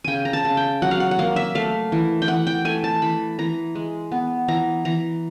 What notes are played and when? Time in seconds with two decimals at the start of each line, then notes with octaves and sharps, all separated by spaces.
0.04 C#3 G5 G#5
0.25 A#5
0.33 A5
0.45 C#3
0.57 G5
0.82 F#3 F#5
0.91 F5
1.00 F#5
1.11 F#5
1.19 A#3 F5
1.36 E5
1.55 A3 F5
1.92 E3
2.22 G5
2.28 E3 F#5
2.47 G5
2.65 A3 G#5
2.84 A5
3.02 E3 B5
3.39 E3 A#5
3.75 G#3
4.12 B3
4.48 E3 A#5
4.85 E3 A#5